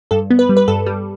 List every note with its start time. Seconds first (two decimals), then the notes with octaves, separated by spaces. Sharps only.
0.11 G2 A4
0.30 B3
0.39 B4
0.49 G3
0.57 B4
0.68 G2 A4
0.86 G3